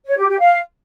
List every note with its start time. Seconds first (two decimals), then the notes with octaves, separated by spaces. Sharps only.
0.06 C#5
0.17 G4
0.28 G4
0.40 F5